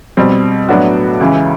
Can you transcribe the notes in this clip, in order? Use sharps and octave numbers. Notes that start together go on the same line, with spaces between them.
B2 G3 C4
A2 F#3 B3 D4 F#4
C#2 C#3 E3